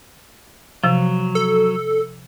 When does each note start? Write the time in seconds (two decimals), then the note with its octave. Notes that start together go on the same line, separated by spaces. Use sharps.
0.84 C3 F3 F#3
1.35 A4